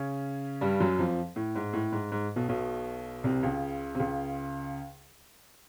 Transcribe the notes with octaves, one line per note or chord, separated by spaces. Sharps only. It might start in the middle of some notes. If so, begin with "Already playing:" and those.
Already playing: C#3 C#4
G2 G3
F#2 F#3
F2 F3
A2
G#2
A2
G#2
G#2
B1 B2
B1 B2
C2 C3
C#2 C#3
C3
C#2 C#3